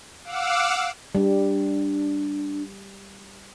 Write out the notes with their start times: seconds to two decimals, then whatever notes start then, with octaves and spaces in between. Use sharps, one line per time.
0.24 F5 F#5 D6 E6
1.15 G3 D4